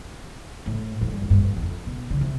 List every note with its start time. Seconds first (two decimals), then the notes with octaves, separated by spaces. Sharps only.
0.66 A2
1.01 F2
1.12 G2
1.22 F2
1.30 G2
1.38 F2
1.57 E2
1.62 F2
1.87 B2
2.10 D3
2.21 C3